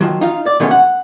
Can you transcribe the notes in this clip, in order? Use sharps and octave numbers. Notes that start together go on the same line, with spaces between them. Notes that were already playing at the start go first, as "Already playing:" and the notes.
D#3 F3 F#3
D#4 F4 F5
D5
B2 D#3 G#3 A3 C4 C#4
F#5